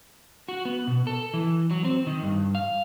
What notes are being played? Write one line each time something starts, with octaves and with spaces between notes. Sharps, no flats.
F#4
B3
B2
A4
E3
F#3
C4
D#3
G2
F5